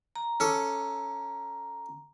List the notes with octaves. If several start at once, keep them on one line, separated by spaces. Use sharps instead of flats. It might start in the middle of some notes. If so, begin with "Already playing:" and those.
A#5
C#4 A4 D6